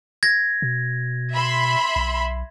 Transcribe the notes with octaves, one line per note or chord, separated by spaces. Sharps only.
G#6 A#6
B2
E5 B5 C6
B1